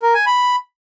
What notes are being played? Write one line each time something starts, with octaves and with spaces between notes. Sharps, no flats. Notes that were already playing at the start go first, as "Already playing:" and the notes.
A#4
G#5
B5